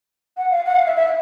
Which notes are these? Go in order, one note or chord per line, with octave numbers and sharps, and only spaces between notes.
F#5
F5
F#5
F5
E5
E5